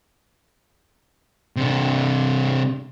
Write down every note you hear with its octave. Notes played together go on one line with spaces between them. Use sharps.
C3 D4